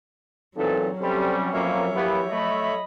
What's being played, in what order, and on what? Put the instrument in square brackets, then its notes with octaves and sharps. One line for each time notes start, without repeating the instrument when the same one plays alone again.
[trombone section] B1 A#2 A4 [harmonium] E3 C4 D#4 [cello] F#3
[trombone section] C3 G3 [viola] C#4 [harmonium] A4 C5
[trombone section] F2 B2 A#3 [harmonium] C#5 E5
[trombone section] E3 A#3 B3 [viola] G4
[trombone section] A3 [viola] D#5 B5